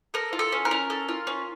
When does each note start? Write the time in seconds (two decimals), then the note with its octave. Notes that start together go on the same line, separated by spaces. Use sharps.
0.14 A4 A#4
0.33 F4
0.39 A4
0.52 C#4
0.65 A#4
0.71 C#4
0.90 A4
1.09 F4
1.27 C#4